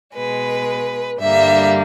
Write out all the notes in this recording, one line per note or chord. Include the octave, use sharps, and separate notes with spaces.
B2 G#3 B4
G2 D3 G3 A#3 E5